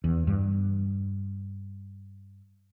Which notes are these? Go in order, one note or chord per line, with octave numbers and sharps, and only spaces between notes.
E2
G2